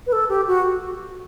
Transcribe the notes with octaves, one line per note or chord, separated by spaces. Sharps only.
B4
A4
G4
F#4